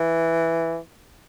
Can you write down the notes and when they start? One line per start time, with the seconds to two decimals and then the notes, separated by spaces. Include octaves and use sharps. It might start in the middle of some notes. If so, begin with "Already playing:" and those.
Already playing: E3